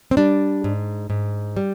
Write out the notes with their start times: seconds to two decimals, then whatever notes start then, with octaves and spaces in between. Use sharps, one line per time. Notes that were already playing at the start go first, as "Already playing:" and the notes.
0.11 C4
0.17 G3 D4
0.64 G#2
1.10 G#2
1.57 G3